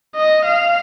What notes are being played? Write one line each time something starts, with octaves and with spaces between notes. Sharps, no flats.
D#5
F5